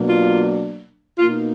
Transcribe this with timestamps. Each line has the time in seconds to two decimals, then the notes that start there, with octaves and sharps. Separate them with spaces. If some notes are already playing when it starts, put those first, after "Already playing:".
Already playing: B2 F#3 A#3 D4
0.09 F4
1.18 B2 A#3 D#4 F4